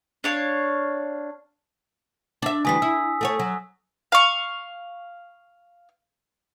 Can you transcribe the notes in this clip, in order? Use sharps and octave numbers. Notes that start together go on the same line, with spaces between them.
D4 C#5 F5
D4 E5
D2 E3 G3 G#5 D#6 B6
E4 E6
A3 F#4 C#5
F#3
F5 C#6